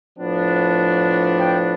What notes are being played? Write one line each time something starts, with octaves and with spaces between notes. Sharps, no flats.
A2 F3 B3 D4
G5